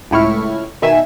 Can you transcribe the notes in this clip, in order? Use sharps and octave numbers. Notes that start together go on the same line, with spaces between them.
C#2 A2 E4 C#6 F6
B2 D#3 E5 G#5 E7